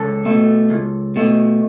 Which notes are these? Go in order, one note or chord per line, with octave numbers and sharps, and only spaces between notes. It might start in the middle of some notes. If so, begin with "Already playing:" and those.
Already playing: C#2 A4
B2 A3
C#2
B2 A3